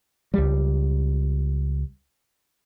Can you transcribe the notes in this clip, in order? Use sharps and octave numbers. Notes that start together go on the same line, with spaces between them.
C#2 G3